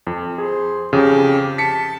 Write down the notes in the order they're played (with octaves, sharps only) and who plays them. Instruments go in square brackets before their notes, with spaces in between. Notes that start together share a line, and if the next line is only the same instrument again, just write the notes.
[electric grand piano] F2
[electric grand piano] G#4 [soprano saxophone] C5
[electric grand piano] F2 C#3 [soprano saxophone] G4
[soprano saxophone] A5 [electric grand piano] B6 C#7